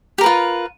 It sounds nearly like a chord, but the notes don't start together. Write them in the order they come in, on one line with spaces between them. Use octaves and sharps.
G4 A#4 B4 F4